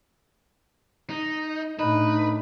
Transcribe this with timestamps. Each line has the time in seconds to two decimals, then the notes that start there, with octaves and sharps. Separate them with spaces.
1.10 D#4
1.79 A2 D4 D#4 B4